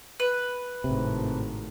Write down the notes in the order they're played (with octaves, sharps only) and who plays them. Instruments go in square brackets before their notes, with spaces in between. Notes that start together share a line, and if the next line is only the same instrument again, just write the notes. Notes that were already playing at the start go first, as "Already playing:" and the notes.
[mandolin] B4
[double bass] G#1 A2 [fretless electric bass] C3